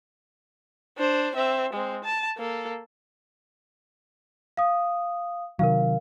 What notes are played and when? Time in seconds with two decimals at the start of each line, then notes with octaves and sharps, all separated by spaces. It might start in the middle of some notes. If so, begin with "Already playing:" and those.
0.98 D4 C5
1.35 C4 E5
1.73 G#3 C4
2.04 A5
2.38 A#3 A4
4.57 F5 D#6
5.59 C3 D#3 F#3 A#4 F5